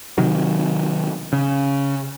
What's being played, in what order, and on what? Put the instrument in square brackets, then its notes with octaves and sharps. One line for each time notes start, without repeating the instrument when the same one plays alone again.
[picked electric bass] C3 D#3 F#3
C#3